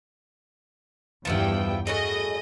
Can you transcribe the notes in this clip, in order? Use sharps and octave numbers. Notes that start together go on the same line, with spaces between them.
E2 G2 F3 B3 E4 G5
A2 F#4 G#4 D#5